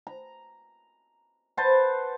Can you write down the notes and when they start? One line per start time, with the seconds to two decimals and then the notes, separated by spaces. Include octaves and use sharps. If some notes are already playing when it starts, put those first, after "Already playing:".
0.07 A#5
1.57 B4 C5 F#5 A5